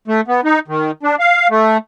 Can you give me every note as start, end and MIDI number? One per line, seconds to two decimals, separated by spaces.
0.08 0.21 57
0.28 0.41 59
0.44 0.59 63
0.68 0.91 51
1.03 1.16 62
1.20 1.48 77
1.50 1.77 57